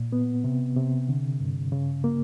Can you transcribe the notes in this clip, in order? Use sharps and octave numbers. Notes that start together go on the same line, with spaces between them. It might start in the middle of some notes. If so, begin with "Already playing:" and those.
Already playing: A#2
B3
C3
C3
D3
G2
C#3
A#3